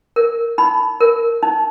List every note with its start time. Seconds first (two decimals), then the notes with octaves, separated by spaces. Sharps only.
0.16 A#4
0.58 D#4 B5
1.01 A#4
1.43 D#4